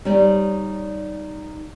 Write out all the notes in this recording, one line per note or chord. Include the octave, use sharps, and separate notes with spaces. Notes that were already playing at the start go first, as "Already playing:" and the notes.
G3 D#4 C#5 D5